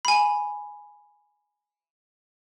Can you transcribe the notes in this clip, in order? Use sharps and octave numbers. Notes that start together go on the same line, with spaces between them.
G#5 B5